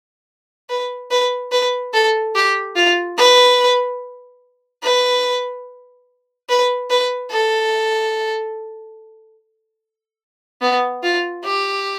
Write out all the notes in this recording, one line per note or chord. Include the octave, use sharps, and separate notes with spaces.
B4
B4
B4
A4
G4
F4
B4
B4
B4
B4
A4
B3
F4
G4